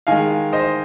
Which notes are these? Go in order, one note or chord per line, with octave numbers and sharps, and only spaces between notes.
D#3 G#3 F5 G#5
C5 D#5